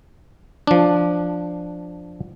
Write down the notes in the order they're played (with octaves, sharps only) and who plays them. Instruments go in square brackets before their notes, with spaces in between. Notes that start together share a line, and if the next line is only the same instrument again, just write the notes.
[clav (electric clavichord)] F3 D4